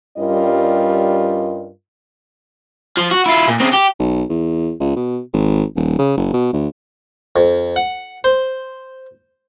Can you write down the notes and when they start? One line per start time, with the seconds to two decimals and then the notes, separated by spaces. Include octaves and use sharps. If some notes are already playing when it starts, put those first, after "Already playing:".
0.18 G2 G3 C#4 F4 A#4 D#5
2.97 F3
3.11 F#4
3.26 E4 F4
3.48 A#2
3.60 C#3 C4
3.73 G4
3.99 B1
4.29 E2
4.80 C#2
4.96 B2
5.33 G#1
5.76 D#1
5.99 C#3
6.17 F#1
6.34 B2
6.53 D2
7.36 F2
7.76 F#5
8.24 C5